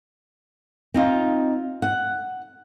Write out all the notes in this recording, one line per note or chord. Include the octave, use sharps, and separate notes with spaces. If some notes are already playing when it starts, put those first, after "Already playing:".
C4 D#4 F4
F#5